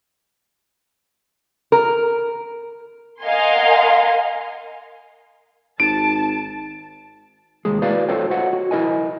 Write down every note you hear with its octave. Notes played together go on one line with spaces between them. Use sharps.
A#4
A#4 D#5 F5 F#5 G#5 C6
G#1 A5 D7
D#2 G#3 G#4
E4 F#4 B4 D5 F5
F4 F#4 A4 C5 C#5 G5
F#4 C5 C#5 D#5 F#5
F#4
E4 A#4 D#5 G#5